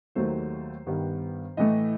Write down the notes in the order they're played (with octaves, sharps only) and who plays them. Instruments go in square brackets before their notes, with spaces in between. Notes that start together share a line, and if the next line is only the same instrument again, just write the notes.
[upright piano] D#2 D#3 F#3 A3 C5
G2 D#3 G3 B3
A2 E3 A3 D#5